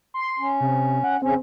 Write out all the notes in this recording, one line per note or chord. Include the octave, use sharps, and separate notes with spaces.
C6
C#4
C3
F#5
F2 C#3 C4 C#4